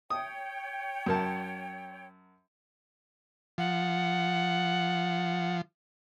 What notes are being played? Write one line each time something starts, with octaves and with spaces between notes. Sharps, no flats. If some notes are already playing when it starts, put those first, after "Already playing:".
C#5 G5 D#6
F#2 A#4 A5
F3 F#5